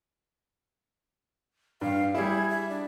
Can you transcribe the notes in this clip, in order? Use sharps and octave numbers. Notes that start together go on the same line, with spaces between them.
G2 F5
G3 E4 G#4
E5
D4